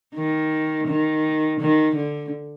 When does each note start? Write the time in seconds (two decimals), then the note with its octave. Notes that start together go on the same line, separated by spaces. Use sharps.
0.15 D#3
0.87 D#3
1.60 D#3
1.95 D3